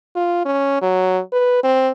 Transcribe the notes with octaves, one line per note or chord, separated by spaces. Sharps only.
F4
C#4
F#3
B4
C4